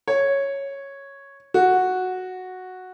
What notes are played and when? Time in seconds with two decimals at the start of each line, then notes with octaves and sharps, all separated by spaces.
0.08 C#5
1.54 F#4